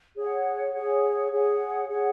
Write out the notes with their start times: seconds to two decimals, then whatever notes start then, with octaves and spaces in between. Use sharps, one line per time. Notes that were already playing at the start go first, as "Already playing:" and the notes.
0.16 G#4 C#5 F#5
0.72 G#4 C#5 F#5
1.31 G#4 C#5 F#5
1.87 G#4 C#5 F#5